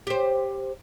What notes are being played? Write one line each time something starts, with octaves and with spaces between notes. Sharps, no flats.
G4 C5